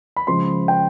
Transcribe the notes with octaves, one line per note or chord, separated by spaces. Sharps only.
B5
C#3 F3 G#3 C6
G5